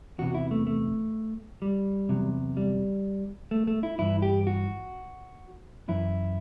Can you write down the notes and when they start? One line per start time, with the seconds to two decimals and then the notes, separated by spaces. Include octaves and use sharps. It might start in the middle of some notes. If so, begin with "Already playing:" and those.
0.18 E2 C3 E3 F#4
0.34 E4
0.51 A3
0.67 A3
1.62 G3
2.09 E2 C3 F#3
2.57 G3
3.51 A3
3.67 A3
3.83 E4
3.98 G2 E3 E4
4.22 G4
4.47 F#4
5.88 F#2 E3 E4